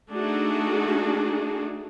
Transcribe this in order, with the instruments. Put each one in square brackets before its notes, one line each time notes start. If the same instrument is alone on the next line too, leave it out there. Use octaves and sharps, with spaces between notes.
[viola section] A3 D4 D#4 F#4 G#4